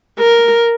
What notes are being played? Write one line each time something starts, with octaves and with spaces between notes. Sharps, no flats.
A#4